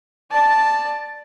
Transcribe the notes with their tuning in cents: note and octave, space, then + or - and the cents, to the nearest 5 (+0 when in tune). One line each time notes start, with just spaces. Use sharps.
D5 +10 A5 +0